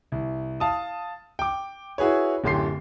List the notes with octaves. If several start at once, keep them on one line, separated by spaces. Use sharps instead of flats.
C2
F5 A5 D#6
G5 D6
E4 F#4 G#4 B4 C#5
D1 F#2 D3 G4 C6 C7